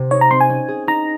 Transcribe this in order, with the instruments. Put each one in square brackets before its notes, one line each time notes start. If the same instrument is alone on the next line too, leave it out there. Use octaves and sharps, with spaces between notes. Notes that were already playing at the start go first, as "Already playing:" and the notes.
Already playing: [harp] C3
[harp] D#4 [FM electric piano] C#5
[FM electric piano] A#5
[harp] C4 [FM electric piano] C6
[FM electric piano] G#5
[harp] C#4
G#4
[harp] D#4 [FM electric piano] A#5